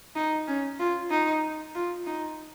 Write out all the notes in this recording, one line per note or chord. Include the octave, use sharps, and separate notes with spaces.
D#4
C#4
F4
D#4
F4
D#4